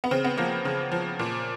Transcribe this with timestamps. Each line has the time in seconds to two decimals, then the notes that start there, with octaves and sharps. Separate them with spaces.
0.04 B3
0.11 C#3 C4
0.24 B3
0.37 F3 A#3
0.65 C#3
0.92 F3
1.19 A#2